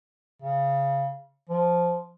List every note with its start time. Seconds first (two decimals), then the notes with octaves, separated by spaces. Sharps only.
0.42 C#3
1.49 F3